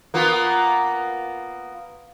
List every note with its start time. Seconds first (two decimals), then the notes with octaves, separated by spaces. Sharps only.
0.14 A#3 B3 F4